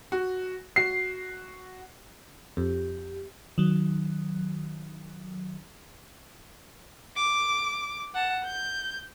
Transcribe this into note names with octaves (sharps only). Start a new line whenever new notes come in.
F#4
F#4 C7
F2 G4
D#3 F#3
D6
F#5 A5
G6